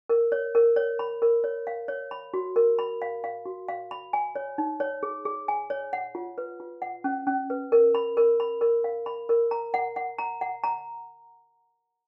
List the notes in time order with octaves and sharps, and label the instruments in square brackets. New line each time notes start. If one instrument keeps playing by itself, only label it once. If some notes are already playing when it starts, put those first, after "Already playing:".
[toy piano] A#4
C#5
A#4
C#5
B5
A#4
C#5
F5
C#5
B5
F#4
A#4
B5
F5
F5
F#4
F5
B5
G#5
C#5
D#4
C#5
G#4
G#4
G#5
C#5
F#5
F4
B4
F4
F#5
C#4
C#4
B4
A#4
B5
A#4
B5
A#4
F5
B5
A#4
A#5
F#5
F#5
A#5
F#5
A#5